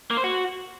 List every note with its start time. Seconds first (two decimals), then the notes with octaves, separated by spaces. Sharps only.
0.10 A#3
0.17 C5
0.24 F#4